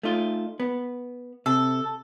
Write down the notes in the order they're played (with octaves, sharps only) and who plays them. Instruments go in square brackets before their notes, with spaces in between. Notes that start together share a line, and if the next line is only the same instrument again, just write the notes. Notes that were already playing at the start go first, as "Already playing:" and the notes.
[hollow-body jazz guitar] A3 D#4 F4
B3
[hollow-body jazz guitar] C3 [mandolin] A4